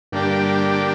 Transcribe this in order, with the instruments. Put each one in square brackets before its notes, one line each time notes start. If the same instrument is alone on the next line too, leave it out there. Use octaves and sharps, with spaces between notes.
[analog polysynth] G2 [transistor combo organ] D3 G3 A#3 D4 G4